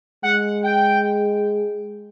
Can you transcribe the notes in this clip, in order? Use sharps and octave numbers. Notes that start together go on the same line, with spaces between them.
G#3 F#5
G5